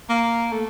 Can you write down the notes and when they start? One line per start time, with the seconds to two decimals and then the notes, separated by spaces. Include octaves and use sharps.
0.09 A#3
0.52 A3